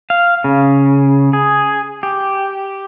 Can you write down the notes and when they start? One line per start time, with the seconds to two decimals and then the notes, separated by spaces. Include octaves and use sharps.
0.10 F5
0.44 C#3
1.33 G#4
2.03 G4